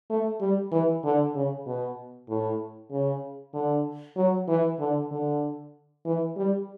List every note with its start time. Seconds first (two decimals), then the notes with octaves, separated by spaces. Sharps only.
0.10 A3
0.41 G3
0.72 E3
1.04 D3
1.35 C#3
1.66 B2
2.29 A2
2.91 C#3
3.54 D3
4.17 F#3
4.48 E3
4.80 D3
5.12 D3
6.05 E3
6.36 G3